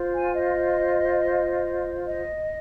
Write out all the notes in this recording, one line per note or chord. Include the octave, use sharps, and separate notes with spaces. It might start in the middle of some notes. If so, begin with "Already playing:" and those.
Already playing: F4 C5
G#5
D#5
D#5